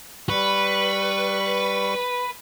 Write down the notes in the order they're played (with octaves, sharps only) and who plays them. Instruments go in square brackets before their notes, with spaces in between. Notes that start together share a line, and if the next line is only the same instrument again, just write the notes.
[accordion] G3 C#6 [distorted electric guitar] B4